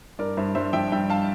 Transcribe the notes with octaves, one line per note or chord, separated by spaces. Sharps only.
G2 A#4 D5
G2 C5 E5
G2 C5 E5
F3 E5 G5
G2 E5 G5
F5 A5